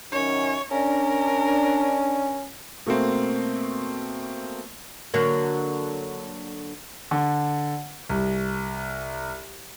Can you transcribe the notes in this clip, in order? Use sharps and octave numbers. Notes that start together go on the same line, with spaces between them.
F#2 D#3 C#4 C#5
C#4 D4 A#4
B2 A3 A#3 C4
D3 F#3 A#3
D3
C2